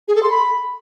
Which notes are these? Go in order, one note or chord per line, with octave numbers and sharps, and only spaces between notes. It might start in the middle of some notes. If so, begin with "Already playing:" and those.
G#4
A4
C6
B5